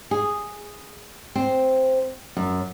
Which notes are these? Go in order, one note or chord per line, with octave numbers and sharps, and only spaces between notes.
G#4
C4
F#2